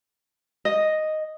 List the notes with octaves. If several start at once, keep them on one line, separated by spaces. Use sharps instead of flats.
D#5